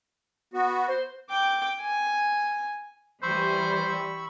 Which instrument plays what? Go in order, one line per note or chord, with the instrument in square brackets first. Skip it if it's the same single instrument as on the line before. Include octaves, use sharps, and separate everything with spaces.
[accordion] B3 F#4
[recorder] C5
[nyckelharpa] G5 D6
G#5
[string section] E3 G3 [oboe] C5 [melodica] B5 C#6 E6